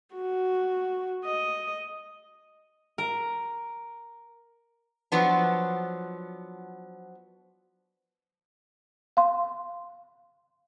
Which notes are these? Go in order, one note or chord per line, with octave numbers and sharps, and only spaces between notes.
F#4
D#5
A#4
F3 F#3 B3 D4
F5 C6